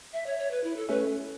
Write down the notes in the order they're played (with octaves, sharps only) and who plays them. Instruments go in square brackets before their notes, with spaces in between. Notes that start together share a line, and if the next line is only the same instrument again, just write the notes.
[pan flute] E5
C#5
C#5
B4
E4
A4
[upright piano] A3 C#4 [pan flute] B4